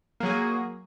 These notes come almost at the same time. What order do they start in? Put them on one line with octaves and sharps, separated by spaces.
A#3 F#3 G#4